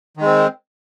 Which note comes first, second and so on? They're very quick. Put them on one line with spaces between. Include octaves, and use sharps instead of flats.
D#3 G#3 C4